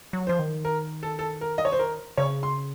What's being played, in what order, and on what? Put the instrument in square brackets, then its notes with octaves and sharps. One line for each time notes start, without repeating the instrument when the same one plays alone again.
[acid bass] F#3
[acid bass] F3 [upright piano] C5
[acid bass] D#3
[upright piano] A#4
A4
A4
A#4
D#5
C#5
C5
A#4
[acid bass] C#3 [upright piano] C#5
[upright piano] C6